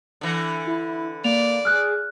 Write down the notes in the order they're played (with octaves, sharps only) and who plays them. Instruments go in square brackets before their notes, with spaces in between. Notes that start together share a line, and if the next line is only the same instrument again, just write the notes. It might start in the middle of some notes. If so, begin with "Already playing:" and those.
[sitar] D3 E3
[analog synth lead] E4
[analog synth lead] A#3 [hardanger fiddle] D5 [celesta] F7
[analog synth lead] G#4 [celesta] F6 F#6